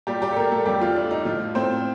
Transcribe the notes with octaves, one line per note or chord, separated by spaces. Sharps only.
A#2 G3 G4
G3 G4
A4
A3 A#3 A#4
A3 A4
F2 G3 G4
F3 F4
A3 D4
D#4
A2 F3 F4
A2 C4 C5